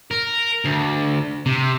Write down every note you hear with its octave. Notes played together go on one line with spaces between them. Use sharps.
A#4
D2
C3